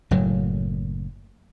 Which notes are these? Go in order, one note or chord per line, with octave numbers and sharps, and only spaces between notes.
F#1 A2 F#3